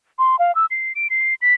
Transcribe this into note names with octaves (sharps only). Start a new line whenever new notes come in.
C6
F5
E6
C7
D7
C7
B6